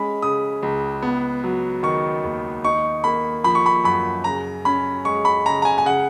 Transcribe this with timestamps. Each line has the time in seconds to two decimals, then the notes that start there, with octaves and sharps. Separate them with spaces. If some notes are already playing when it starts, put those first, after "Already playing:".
Already playing: G#3 C#4 B5
0.22 C#3 D#6
0.63 C#2
1.03 B3
1.43 F#3
1.83 D#3 C#6
2.24 D#2
2.64 D#4 C#6
3.04 A#3 B5
3.44 F3 B5
3.55 C#6
3.66 B5
3.84 F#2 B5
4.24 C#3 A#5
4.65 C#4 B5
5.05 G#3 C#6
5.25 B5
5.46 C#3 A#5
5.62 A#5
5.65 G#5
5.78 G#5
5.85 C#3 F#5